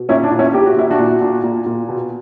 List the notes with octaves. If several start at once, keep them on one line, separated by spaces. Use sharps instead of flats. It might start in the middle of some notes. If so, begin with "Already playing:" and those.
Already playing: B2
A#2 C#4 E4
D4
A#2
C#4 E4
A#2 G4
F#4
A#2 E4
D4 F#4
A#2
A#2
A#2
A#2
B2